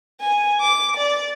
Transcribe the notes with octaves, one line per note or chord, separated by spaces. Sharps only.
G#5
D6
D5